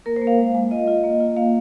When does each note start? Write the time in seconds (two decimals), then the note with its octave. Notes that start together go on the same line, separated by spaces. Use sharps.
0.06 A#3 A#4
0.16 C5
0.22 A#3
0.27 F5
0.39 G#3
0.55 G#3
0.71 F4 D#5
0.87 F4
1.04 A#3
1.20 F4
1.37 A#3 F5